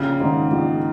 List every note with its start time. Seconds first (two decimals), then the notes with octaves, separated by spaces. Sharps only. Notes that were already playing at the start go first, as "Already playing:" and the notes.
Already playing: A#1 C#3
0.20 G#2 D#3
0.52 A#1